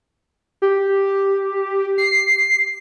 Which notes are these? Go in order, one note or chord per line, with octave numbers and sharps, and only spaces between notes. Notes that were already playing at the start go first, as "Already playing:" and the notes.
G4
C7